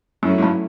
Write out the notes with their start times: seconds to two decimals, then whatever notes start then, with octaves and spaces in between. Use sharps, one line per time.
0.23 F#2 F#3 A3 C#4 E4
0.38 G#2
0.43 G2